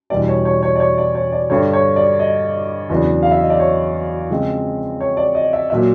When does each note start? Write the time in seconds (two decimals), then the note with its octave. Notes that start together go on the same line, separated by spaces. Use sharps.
0.10 E2 B2 G3 B3 D4 D5
0.28 C#5
0.45 C#5
0.63 C#5
0.76 D5
0.80 C#5
0.98 D5
1.15 C#5
1.32 D5
1.50 G2 D3 G3 C#5
1.73 C#5
1.96 D5
2.19 D#5
2.89 E2 C#3 F#3 B3 D4
3.23 F5
3.31 E5
3.41 D#5
3.50 D5
3.59 C#5
4.30 C#3 F3 G#3 C4
5.01 C#5
5.17 D5
5.35 D#5
5.53 E5
5.70 A#2 F#3 E5